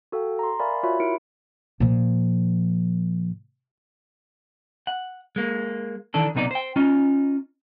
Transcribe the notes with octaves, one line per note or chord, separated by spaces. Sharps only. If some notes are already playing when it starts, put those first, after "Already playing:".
F#4 A4 F5 G5
A#5 C6
A#4 D5 E5 F5 G#5 B5
F4 F#4 C#5 E5 B5
E4 A#4 C#7 D7
A#2 F3
F#5
G#3 A#3
D#3 E3 D4 A4
B1 C3 B3 D#4 F#4 D5
C5 G5
C#4 D#4 F4